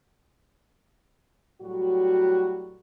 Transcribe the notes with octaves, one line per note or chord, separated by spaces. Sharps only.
A2 F#3 G3 F#4